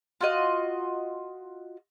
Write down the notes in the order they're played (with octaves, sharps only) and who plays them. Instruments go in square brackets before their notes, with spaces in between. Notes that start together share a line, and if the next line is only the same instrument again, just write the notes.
[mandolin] F4 F#4 D#5